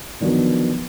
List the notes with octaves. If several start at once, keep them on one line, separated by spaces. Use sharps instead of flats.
D3 D#3 F3 F#3 B3